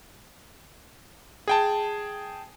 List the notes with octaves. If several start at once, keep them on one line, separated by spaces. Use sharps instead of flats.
G#4 G5 A5